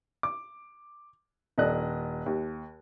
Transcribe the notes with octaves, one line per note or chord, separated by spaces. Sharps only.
D6
D#1 D4 A4 D#5 F#6
D#2